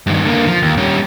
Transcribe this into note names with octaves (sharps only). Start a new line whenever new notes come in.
G2 D#3
D3 A#3
F3
D#2
G3 C#4